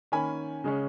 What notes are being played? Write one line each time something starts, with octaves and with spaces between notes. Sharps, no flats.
D#3 A#3 C#4 G#5 B5
C#3 G#3 C#4